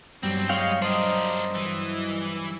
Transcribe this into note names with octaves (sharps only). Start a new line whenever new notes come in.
B1 G2 F#3 G3 C4
G#3 C#5 F5 G5
D4 A#4 C5 D#5
E3